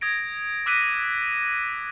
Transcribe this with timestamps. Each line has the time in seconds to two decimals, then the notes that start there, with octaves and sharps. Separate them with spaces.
0.01 D#6 G#6 A#6 D7
0.66 D6 E6 F#6 A#6 B6 D#7